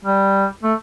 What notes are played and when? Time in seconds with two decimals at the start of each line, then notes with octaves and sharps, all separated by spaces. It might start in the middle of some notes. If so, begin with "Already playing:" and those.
0.05 G3
0.63 A3